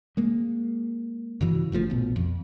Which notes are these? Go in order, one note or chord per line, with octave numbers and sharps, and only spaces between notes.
G#3 A#3
G2 C#3 E3 F#3
G1 D2 F3 A3
A#1 B2
F2